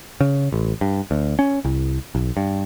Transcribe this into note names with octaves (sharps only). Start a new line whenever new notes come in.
C#3
A1
G2
D2
C#4
C2
B1
G2